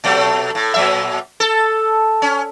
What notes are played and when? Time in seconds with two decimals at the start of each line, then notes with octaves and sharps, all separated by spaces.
0.04 B2 F#3 A3
0.55 A2
0.74 A#2 F#3 E5
1.40 A4
2.22 C#4